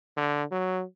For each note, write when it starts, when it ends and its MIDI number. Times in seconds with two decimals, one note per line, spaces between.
0.17 0.44 50
0.51 0.83 54